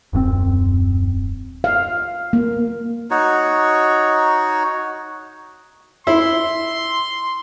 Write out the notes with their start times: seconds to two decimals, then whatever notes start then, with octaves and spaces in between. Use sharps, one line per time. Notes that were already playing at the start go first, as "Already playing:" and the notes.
0.13 D#1 F#2 A3 C4
1.64 F5
2.33 A#3
3.11 D#4 F#4 C#5
6.07 E4 C6